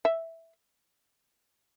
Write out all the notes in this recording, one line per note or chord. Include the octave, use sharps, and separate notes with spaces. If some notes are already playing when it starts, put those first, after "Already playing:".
E5